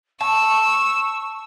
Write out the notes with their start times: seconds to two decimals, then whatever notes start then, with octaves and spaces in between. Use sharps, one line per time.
0.21 A5 C#6 E6